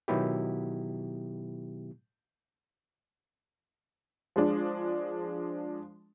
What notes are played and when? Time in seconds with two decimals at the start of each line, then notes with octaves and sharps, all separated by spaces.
0.08 B2 D#3 F#3 B3 E4 G4
4.36 F3 G#3 D4